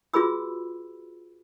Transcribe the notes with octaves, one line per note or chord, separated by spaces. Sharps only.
F4 F#4 G#4 B4 B5 E6